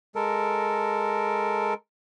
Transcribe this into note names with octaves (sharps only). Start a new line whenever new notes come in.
G#3 A4 A#4